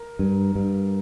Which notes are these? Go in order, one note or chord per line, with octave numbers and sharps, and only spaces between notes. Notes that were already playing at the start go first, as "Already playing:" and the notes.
Already playing: A#4
G2
G2